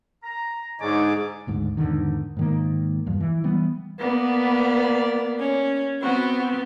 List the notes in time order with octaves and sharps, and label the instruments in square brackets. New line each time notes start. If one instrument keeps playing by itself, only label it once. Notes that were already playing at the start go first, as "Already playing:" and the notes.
[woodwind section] A#5
[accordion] G#2 [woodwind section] D3 C#5 D5 [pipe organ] D#4 G#4 D6
[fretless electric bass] G#1 D2 G#2
E2 G#2 D3 D#3
G#2 D#3 A#3
E2 G2 F3
E3
E3 G3 B3
[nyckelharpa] A#3 D5 [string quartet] B3
[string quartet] C#4
[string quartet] B3 C4 [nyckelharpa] F#4